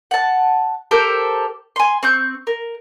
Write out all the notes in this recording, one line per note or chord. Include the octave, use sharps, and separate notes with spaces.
F#5 A5
G4 A4 A#4 C5
G#5 C6
C4 C#6 G6
A#4